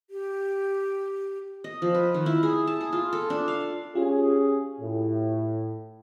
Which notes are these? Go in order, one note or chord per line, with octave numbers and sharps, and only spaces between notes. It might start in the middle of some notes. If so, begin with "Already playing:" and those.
G4
D#5
F3
B4
D#3
E4
G#4
A5
G#4
F4
A4
D4
F5
C#4 F4 G4 G#4
A2